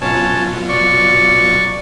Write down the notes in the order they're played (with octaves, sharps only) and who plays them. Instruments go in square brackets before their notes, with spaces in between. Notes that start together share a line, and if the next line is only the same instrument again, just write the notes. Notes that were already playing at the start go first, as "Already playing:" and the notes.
[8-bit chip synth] B2 F#3 F4 [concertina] C#4 C#5 A5
[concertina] D5 C#6